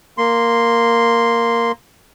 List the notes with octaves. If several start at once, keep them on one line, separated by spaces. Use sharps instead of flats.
A#3 C6